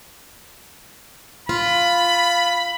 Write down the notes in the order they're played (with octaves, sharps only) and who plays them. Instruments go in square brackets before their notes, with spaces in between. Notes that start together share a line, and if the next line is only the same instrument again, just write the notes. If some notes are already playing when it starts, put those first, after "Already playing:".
[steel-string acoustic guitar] F4 [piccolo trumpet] B5